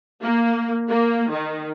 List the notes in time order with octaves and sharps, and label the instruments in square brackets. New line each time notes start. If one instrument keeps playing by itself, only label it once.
[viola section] A#3
A#3
D#3